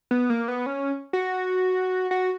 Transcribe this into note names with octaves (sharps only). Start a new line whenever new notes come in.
B3
A#3
B3
C#4
F#4
F#4